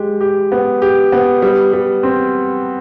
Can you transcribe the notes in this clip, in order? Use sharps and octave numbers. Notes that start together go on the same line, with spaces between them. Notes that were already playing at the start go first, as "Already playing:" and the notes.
Already playing: G#3 G4
G4
B3
G4
B3
G3
G3
C4